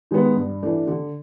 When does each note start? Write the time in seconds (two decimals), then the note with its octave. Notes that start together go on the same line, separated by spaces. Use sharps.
0.11 D#3 G#3 B3
0.37 G2
0.63 E3 A3 D4
0.87 D3